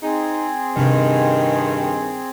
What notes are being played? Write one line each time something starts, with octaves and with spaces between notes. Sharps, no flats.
C4 D#4 G#4
G2 C3 D#3 C#4